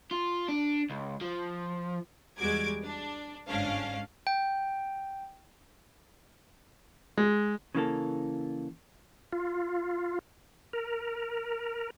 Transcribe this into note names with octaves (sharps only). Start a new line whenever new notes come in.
F4
D4
C#2
F3
E2 G3 G#3 F#4 D6 G#6
D4
G1 G#2 C#4 D4 F5
G5
G#3
C#3 E3 A#3 A4
F4
A#4